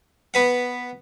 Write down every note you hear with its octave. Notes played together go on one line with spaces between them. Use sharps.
B3 B4 F#5